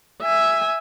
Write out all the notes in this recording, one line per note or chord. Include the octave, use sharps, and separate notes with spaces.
E5 G#5